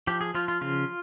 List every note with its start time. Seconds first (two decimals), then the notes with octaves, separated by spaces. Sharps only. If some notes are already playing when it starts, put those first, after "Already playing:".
0.07 F3 G4
0.21 G#4
0.35 F3 F4
0.48 F4
0.61 C#3 F4